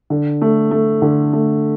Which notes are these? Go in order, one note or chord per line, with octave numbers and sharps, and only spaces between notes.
D3
A3
A3
D3
A3